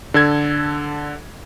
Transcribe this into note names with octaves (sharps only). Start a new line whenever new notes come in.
D3 A4 G#6